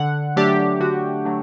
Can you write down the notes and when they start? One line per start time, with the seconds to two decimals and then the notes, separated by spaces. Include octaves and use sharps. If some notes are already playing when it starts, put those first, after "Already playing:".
Already playing: D3 F#5
0.36 F#3 A3 D4 G4
0.80 D3 F#4
1.25 F#3 A3 D4